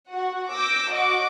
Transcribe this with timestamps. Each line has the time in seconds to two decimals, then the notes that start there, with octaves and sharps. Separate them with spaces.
0.11 F#4 F#5
0.52 D6 E6 G6 A#6
0.92 F#4 D#5 F#5 D6